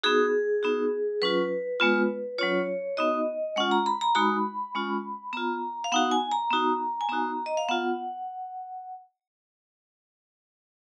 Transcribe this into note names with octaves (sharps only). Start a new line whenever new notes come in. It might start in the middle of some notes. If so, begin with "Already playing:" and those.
B3 D#4 F#4 G#4
B3 D#4 F#4
F#3 C#4 F4 B4
G#3 B3 F4
F#3 C#4 F4 C#5
B3 D#4 F#4 D#5
G#3 C#4 F4 F#5
A#5
B5
A#5
G#3 D#4 F#4 B5
G#3 C#4 F4
B3 F4 A#5
F5
B3 D#4 F#4 F#5
G#5
A#5
B3 D#4 F#4
G#5
B3 D#4 F#4 A#5
D#5
F5
B3 F4 F#5